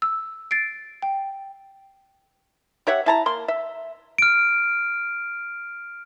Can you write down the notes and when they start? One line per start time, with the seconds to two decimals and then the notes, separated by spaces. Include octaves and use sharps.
0.02 E6
0.51 A6 C7 D7
1.02 G5
2.87 G4 C#5 E5 F#5
3.06 E4 A5 A#5
3.26 A#3 C6
3.48 E5
4.18 F6 D7